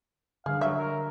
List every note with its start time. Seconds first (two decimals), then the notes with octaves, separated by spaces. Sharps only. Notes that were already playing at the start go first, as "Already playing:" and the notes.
0.46 D3 G3 G#4 F5
0.61 F#3 E5
0.77 A#4